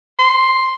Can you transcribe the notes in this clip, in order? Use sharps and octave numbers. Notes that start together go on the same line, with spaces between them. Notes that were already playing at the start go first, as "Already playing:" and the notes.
C6